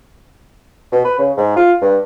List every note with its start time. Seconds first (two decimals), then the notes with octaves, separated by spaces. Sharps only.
0.92 B2
1.05 B4
1.18 C#3
1.37 G#2
1.56 F4
1.81 G2